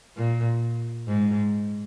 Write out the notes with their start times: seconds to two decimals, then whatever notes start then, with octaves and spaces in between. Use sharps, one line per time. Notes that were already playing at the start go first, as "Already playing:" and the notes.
0.17 A#2
1.08 G#2